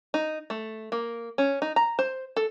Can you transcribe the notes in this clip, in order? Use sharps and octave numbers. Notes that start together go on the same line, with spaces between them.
D#4
A3
A#3
C#4
D#4
A#5
C5
A4